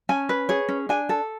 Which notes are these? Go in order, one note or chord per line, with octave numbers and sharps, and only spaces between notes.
C#4 G#5
B4
G#4 C#5
C#4
D4 G#5
A4